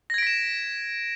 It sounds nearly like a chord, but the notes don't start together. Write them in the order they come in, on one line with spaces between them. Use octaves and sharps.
A#6 G#6 D7 B6 E7